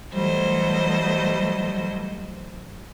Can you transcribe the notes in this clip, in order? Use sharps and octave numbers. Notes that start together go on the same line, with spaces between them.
E3 F#3 G3 A3 C5 D#5